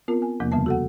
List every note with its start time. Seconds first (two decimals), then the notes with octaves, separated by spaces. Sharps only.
0.08 B3 C4 F4 A#4
0.22 G#5
0.40 E2 C3 F3 A#3
0.52 D2 C#3 G3 B3 A5
0.66 F#4 A4 F#5